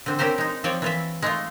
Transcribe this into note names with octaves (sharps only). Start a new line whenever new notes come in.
D3 C4
C4 C#4 G4 A#4 C5
G#3 D#4
F3 C4 F4 C#5 D5
E3 F4 E5
G#3 A3 F4